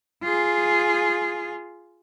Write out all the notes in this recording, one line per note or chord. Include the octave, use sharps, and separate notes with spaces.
F4 G#4